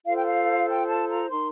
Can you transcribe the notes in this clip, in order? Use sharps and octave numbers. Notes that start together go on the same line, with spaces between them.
F4 A4 C5 F5
G5
F5
G5
A5
A#5
D#4 A#4 C6